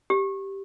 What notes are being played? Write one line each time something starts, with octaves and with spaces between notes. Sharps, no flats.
G4